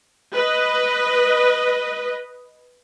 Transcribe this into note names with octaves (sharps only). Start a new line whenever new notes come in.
B4 D#5